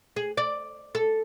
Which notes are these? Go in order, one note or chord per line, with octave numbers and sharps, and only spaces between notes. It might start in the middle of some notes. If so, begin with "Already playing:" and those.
G#4
D5
A4